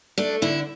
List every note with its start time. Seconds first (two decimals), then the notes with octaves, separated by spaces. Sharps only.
0.18 A3 D4
0.42 D3 E4